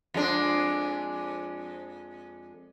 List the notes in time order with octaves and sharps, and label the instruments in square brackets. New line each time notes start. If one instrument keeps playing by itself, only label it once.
[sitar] F2 G#3 D4